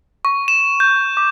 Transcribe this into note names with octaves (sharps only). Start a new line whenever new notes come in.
C#6
E7
G6
D6